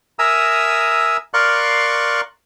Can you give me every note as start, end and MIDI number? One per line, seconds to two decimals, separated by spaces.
0.19 1.17 70
0.19 1.17 76
0.19 1.17 80
0.19 1.17 82
0.19 1.17 87
0.19 1.17 88
1.34 2.21 70
1.34 2.21 74
1.34 2.21 77
1.34 2.21 84
1.34 2.21 85
1.34 2.21 90